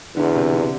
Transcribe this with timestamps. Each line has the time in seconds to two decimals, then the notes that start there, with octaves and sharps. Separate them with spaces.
0.16 E2 D3
0.35 C3
0.53 D3